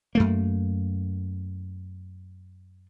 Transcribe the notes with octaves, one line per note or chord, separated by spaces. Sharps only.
F#2 A3 A#3